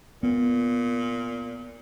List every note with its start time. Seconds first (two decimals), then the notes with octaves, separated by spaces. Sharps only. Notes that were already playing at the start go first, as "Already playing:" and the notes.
0.23 A#2 B3